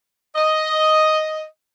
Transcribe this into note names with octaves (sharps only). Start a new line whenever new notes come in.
D#5